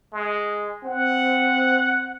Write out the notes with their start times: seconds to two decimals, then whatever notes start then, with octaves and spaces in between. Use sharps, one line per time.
0.13 G#3
0.84 C4 F#5